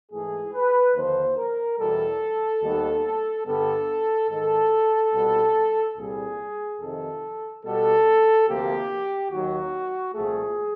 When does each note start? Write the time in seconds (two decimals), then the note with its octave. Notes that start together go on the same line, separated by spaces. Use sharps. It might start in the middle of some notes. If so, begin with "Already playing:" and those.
0.11 G#2 E3 A3 G#4
0.54 B4
0.95 D#2 D3 F3 A#3 C5
1.36 A#4
1.78 E2 B2 G3 A4
2.62 D#2 D#3 G3 B3
3.45 G2 D3 G3 B3 A4
4.29 G#2 D#3 G#3 A4
5.13 C2 B2 G3 B3
5.96 C2 A#2 G3 G#4
6.80 F2 C3 D#3 A4
7.64 B2 G3 B3 A4
8.47 D2 C3 F3 A#3 G4
9.31 D#2 D#3 F#3 F#4
10.14 C2 A#2 F3 A3 G#4